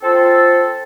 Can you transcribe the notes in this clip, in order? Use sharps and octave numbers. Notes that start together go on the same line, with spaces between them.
C4 F4 A4